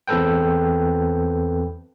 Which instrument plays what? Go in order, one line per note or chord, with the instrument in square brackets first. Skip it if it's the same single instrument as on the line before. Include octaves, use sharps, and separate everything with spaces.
[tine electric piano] E2 C4 A4 B4 G5